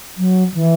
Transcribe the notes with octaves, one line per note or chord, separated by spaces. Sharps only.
F#3
E3